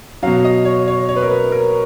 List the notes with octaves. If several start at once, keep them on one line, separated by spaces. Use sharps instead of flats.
B2 F#3 F5
D#5
C#5
C#5
C#5
B4
A#4
B4
A#4